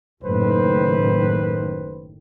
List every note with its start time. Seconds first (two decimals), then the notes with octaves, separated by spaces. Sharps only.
0.24 F#1 A2 D#3 B4 C5